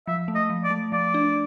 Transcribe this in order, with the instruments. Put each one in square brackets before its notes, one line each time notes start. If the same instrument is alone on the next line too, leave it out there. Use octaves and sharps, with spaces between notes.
[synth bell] F3 [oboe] E5
[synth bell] A3
[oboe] D#5
[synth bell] F3
[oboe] D5
[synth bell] A3
[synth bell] F3 [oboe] D5
[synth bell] D4